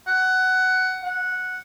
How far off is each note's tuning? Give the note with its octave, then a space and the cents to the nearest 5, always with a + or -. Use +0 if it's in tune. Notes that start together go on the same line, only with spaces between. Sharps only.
F#5 +15
F#5 -5